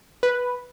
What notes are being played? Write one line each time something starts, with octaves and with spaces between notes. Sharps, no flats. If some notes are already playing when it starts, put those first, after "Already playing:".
B4